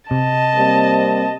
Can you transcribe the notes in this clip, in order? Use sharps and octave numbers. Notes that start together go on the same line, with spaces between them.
C3 D#5 A5
G3 A#3 C4